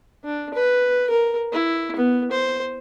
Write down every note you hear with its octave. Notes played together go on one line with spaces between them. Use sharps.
D4
B4
A#4
E4
B3
C5